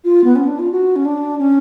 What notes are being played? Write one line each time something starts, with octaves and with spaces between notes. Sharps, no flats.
F4
B3
C#4
D4
F4
F#4
C#4
D4
C#4